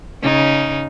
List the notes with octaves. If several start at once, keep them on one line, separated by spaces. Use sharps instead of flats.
C#3 D#4